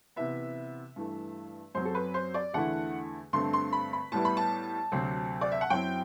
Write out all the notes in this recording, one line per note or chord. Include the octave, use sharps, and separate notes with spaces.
C3 E3 B3 E5
G2 E3 A3
F#2 F#3 C4 C5
A4
B4
C5
D5
E2 D3 A3 E4 F#5
G2 D3 A3 C4 C6
C6
B5
B5
A2 G3 B3 E4 A5
B5
A5
D2 C3 F#3 C4
D5
E5
F#5
F#2 F#3 C4 E4 G5